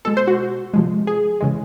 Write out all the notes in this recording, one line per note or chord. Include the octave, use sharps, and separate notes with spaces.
B2 G#3 A4
C5
F#4
C3 F3 G#3
G#4
C#3 E3 G#3